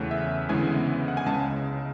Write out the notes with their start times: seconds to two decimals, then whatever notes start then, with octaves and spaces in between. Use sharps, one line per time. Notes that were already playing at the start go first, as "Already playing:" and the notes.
Already playing: E2 C#3 E3 A3 C#4
0.11 E5
0.49 D2 C#3 E3 G#3 B3 G#5
1.08 F#5
1.17 G#5
1.26 C#2 C#3 G#3 A5